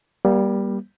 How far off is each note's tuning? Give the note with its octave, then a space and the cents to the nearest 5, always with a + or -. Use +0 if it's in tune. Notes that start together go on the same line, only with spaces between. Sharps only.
G3 +0 A#3 +40